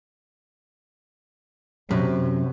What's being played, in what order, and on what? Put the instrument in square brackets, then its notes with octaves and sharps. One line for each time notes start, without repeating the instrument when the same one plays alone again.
[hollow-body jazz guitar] F#2 [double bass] C3